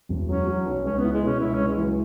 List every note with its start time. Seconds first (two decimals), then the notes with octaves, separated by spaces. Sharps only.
0.09 E1
0.28 F#3 C#4
0.47 F#3
0.66 B1
0.84 C#2 C#4
0.98 B3
1.03 E4
1.12 G#3
1.22 B2 C#4
1.40 C#2 E4
1.54 C#2 C#4
1.68 G#3
1.77 E3
1.82 F#3